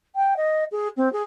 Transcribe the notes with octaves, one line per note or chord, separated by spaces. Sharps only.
G5
D#5
G#4
C4
G#4